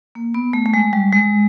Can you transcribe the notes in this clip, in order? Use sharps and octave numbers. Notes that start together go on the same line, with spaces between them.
A#3
B3
A3
A3
G#3
G3
G#3